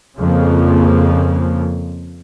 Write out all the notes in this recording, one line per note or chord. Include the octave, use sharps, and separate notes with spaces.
F2 C#3 F3 A#3